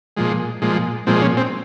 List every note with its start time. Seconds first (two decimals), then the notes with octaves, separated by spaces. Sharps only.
0.17 A#2 F3 G#3
0.62 A#2 F3 G#3
1.07 A#2 F3 G#3 C4
1.22 C#4
1.37 C4